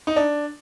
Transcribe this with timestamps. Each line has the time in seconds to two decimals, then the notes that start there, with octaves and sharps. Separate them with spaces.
0.07 D#4
0.16 D4